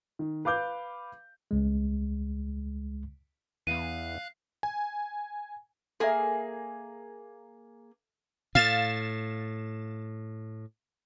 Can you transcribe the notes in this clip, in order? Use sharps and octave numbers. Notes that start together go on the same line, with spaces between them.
D#3
B4 F5 D6 G6
C#2 G#3
E2 E3 B3 F5 F#6 D#7
G#5
A#3 G#4 A4 E5
A2 F5 A6 E7